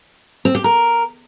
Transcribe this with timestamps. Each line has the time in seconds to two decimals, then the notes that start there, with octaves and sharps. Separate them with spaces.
0.45 C4
0.55 G4
0.64 A#4